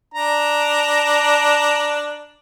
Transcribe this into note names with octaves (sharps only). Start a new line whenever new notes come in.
D4 A#5